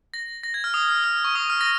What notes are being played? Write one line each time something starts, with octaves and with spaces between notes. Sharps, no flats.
A#6
A#6
G#6
F6
D#6
F6
F6
C#6
D#6
F6
A#6